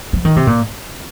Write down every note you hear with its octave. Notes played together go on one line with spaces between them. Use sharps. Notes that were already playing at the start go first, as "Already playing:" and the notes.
F3
D#3
C3
A#2